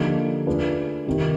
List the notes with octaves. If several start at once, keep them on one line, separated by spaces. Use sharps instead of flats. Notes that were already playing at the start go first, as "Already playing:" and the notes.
Already playing: D3 F3 A#3 D#4 G4
A3 D4 F4 G#4 B4
C3 D#3 G3